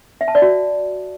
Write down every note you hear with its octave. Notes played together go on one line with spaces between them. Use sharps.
E5
A5
D5
F#4